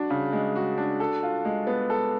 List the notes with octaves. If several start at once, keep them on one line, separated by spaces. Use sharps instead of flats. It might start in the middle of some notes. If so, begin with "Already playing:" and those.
Already playing: D4 F#4
C#3
G#3
F#4
D4
A4
F4
G#3
B3
A4